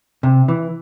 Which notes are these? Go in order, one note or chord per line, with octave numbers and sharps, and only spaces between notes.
C3
E3